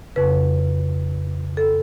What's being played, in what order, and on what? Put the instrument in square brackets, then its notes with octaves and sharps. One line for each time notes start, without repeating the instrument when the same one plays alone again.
[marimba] F2 C#3 B4
A4